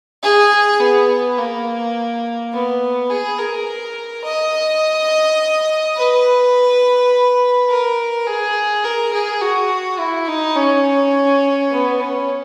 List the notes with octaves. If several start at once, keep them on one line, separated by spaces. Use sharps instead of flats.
G#4
B3
A#3
B3
G#4
A#4
D#5
B4
A#4
G#4
A#4
G#4
F#4
E4
D#4
C#4
B3
C#4